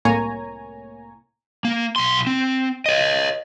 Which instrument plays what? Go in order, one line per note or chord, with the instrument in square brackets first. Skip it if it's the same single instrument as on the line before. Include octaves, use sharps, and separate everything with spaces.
[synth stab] C2 A2 A#3 C#5 G#5 A#5
[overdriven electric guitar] A#3
B1 C6
C4
C#5 D#5